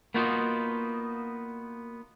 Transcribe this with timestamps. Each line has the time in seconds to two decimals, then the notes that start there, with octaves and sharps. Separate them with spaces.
0.14 A#3 B3 D#4 F4 F#4